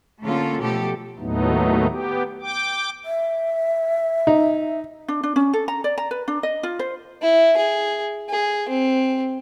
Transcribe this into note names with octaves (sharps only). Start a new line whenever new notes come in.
D3 A3 A#3 C#4 F4 A4
B2 F3 A3 G4 A4
D#2 A2 F#3 A3 B3 D#4
B3 G4
G5 D6
E5
D#4
D4
D4
C#4
A4
A#5
D5
A#5
B4
D4
D#5
F4
C5
E4
G#4
G#4
C4